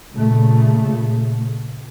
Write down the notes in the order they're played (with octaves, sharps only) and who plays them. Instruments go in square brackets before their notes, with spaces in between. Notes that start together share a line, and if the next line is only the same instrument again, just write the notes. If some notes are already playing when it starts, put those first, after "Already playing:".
[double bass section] A#2 C#3 A3